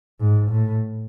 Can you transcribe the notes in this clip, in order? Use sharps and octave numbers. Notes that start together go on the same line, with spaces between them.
G#2
A2